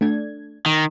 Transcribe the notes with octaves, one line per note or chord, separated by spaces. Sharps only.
A3 D4 G#6
D#3